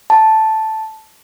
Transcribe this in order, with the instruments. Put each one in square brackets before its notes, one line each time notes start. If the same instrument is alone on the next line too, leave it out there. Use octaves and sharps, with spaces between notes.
[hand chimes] A5